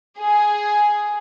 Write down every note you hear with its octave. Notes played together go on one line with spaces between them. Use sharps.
G#4